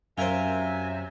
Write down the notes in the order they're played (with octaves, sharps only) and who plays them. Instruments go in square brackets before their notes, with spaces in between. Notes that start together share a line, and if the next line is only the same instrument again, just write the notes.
[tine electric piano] F#2 [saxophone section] C3 F#3 E5 [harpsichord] F4 A#4 C5 [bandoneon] G#5